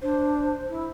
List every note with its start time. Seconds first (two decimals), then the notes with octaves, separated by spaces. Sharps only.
0.02 D4 C5
0.68 E4